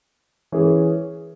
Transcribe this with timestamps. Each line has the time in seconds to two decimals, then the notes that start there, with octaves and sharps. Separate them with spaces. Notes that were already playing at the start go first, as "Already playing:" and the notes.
0.52 E3 C#4 G#4